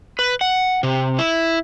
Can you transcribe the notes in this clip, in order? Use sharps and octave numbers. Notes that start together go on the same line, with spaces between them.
B4
F#5
C3
E4